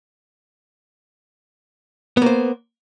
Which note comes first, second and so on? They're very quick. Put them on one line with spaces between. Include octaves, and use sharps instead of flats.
B3 A#3 C5